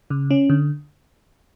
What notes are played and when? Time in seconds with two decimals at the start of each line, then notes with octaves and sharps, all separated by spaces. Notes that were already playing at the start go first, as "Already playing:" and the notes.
0.10 C#3
0.31 C#4
0.50 D3